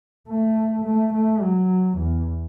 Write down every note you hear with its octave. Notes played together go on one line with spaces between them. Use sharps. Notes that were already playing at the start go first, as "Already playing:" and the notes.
A3
A3
A3
F#3
E2